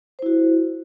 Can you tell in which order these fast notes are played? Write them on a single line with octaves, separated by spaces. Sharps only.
C5 E4 F#4